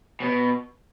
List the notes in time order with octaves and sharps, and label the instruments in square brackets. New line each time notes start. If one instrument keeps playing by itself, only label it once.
[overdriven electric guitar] B2